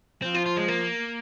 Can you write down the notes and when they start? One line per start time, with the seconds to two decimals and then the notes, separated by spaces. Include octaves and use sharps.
0.22 F3 C4
0.34 F4
0.46 F4
0.57 G#3
0.68 A#3